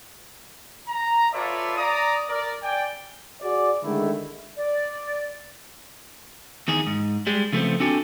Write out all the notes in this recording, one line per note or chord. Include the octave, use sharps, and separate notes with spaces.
A#5
F4 A4 B4 C#5 D5 E5
D5 A#5 D#6
A#4 D5
D5 G5 G#5
F#4 G#4 D5
D3 D#3 G#3 A3 E4
D5
E2 D#3 G#4
G#2
G3 G#3
C#3 F3 A3 B3 C4
C4 D4 F#4 G4 A4 G#5